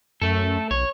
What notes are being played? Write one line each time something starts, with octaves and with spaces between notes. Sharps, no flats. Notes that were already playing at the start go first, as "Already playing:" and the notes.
F#2 A3 A4
B1 C#5